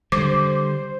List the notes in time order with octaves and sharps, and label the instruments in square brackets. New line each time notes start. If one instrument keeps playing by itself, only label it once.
[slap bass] D3 G3 [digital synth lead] C5 [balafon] D6